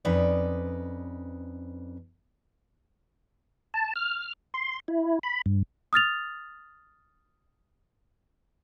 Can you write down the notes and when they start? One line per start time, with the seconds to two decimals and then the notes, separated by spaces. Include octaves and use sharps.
0.05 F2 C#4 D#4 B4 D5
3.74 A5
3.96 F6
4.54 C6
4.88 E4
5.23 B5
5.46 G2
5.93 D#6 F6 A6 F7